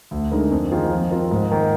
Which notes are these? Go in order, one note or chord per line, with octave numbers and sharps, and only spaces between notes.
D2
D3 G#3 D#4 A#4
F2
D#3 A#3 F4 G#4
F3
C4 F4 A#4
G#2
D#3 A#3